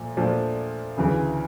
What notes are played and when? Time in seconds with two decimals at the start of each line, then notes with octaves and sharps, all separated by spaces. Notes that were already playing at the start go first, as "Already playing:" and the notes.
Already playing: A#2 F3 A3
0.17 A#2 F3 A3 D4
0.97 D2 C#3 E3